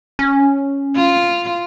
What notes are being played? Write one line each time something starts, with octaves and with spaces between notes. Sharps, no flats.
C#4
F4